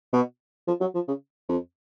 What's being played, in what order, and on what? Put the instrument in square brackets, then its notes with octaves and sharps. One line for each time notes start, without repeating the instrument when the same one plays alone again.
[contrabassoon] B2
F3
F#3
F3
C#3
F2